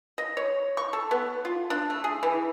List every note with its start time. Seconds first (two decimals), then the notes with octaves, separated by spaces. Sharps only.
0.18 D#5
0.37 C#5
0.77 C#6
0.93 A4
1.11 B3
1.45 F4
1.70 D4
1.90 A3
2.04 G#4
2.23 E3